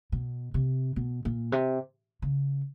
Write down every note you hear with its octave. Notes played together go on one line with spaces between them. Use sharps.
B2
C3
B2
A#2
C3
C#3